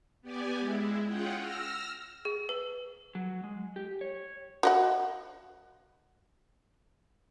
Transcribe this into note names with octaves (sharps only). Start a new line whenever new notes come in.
B3 G4 D5 G#5
G#3 E4
C#4 F4 G#4 F#5 G5
E6 F6 A#6
G#4
B4
F#3
G#3
G4
C#5
F#4 D#5 F#5